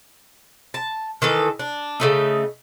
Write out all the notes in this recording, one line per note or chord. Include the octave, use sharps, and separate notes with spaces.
A5
D#3 E3 A4
D4
C#3 A3 D#4